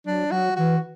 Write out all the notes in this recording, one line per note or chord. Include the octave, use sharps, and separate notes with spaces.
F#3 D4
F#3 F#4
E3 F#4